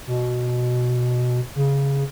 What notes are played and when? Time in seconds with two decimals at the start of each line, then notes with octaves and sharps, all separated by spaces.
0.07 B2
1.56 C#3